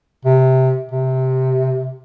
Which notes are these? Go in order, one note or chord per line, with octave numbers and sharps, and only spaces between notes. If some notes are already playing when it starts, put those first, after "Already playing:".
C3
C3